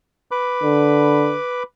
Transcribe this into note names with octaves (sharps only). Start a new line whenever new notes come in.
B4 B5 D6
D3